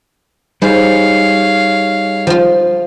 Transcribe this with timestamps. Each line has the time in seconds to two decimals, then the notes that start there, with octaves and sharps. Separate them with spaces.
0.62 G3 D#4 G#4 C5 C#5 F5
2.27 F3 F4